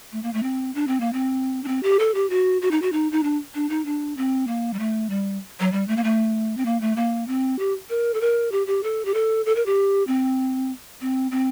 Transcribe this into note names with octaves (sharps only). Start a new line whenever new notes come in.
A3
A#3
A3
C4
D4
C4
A#3
C4
D4
C4
G4
A4
G4
F#4
F#4
D#4
F#4
D#4
D#4
D4
D4
D#4
D4
C4
A#3
G3
A3
G3
F#3
G3
A3
A#3
A3
C4
A#3
A3
A#3
C4
G4
A#4
A4
A#4
G4
G4
A4
G4
A4
A4
A#4
G4
C4
C4
C4